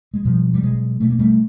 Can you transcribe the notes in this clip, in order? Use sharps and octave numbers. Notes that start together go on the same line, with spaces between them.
G#3
B2 F3 G3
G3
B2 F#3 G#3
B2 A3
A#3
G3 A3